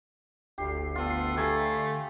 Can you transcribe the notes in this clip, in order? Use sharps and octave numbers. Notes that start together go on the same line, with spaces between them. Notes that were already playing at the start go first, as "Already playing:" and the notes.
F#1 D2 G4 C7
B3 F4 A4
D3 A3 G4 G#5 A#5